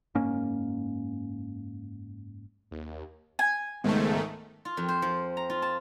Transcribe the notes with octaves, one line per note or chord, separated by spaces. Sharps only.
F#1 G#2 A#3 C#4
D#2
G#5
C#2 G#2 D#3 G#3 A3 B3
F4
F2
C5
F3
A#5
F4
A5